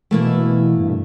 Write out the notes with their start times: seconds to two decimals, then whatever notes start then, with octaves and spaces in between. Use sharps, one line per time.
0.11 B2 E3 A3 A#3 E4
0.77 G2 A#2